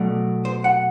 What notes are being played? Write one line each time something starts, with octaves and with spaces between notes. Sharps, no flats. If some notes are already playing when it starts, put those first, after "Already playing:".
Already playing: B2 F#3 A3 D4
C5
F#5